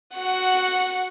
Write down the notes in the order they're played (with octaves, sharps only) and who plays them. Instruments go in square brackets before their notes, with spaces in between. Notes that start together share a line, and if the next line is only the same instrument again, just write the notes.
[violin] F#4 F#5